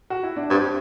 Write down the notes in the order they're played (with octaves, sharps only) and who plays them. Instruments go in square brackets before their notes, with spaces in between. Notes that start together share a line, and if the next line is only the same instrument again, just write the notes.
[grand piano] F#4
E4
D4
[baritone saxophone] G2 [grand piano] C4